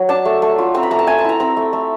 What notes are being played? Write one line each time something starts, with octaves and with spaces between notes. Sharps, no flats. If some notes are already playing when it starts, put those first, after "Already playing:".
Already playing: F#3
D4 A5
A3
A3
F4
C4 A#5
B5
A3 A#5
A5
A3 G#5
A5
E4 A#5
C4 A#5
A3
A3